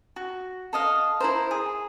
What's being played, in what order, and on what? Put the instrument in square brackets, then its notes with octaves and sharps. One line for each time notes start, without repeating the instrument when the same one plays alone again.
[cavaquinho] F#4
A4 D#5 F5
E4 A#4 C5
G#4